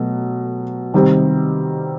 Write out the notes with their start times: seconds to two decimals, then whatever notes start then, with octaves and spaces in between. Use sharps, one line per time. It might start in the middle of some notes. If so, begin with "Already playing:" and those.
Already playing: B2 F#3 A3
0.94 C3 D#3 G3 C4